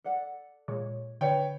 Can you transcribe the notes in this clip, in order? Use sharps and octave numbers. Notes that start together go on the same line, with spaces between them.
A4 D5 F#5
A#2 G#3 C#5
D3 B4 C#5 G5